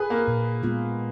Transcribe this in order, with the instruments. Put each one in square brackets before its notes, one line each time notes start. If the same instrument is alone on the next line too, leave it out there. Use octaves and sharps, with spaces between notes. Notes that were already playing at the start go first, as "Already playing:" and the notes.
Already playing: [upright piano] G#4 B4
A#3
[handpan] A#2
G#3 B3 F4